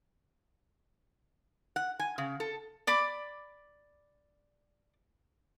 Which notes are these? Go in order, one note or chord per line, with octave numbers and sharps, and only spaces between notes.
F#5
G#5
C#3
A4
D5 B5 D6